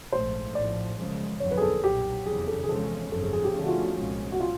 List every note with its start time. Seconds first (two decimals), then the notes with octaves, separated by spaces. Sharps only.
0.12 A#1 G#2 F3 A3 C5
0.55 A#1 A2 F3 D5
0.98 F#2 C#3 F3 G#3
1.40 G1 F2 D3 F#3 C#5
1.51 B4
1.57 G#4
1.61 A4
1.83 B1 A#2 F#3 G4
2.26 F1 E2 C#3 G#4
2.48 A4
2.64 G#4
2.69 E2 C3 F3 G#3 C#4 A4
3.12 G#1 F#2 C#3 F3 A4
3.22 G#4
3.33 G#4
3.44 G4
3.55 D2 D3 F3 A3 C#4 G#4
3.64 F#4
3.68 F4
3.82 F#4
3.97 C2 A#2 F3 G#3 C#4
4.32 F#4
4.40 F4